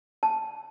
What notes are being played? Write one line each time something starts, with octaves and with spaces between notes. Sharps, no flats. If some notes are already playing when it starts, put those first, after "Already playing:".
A5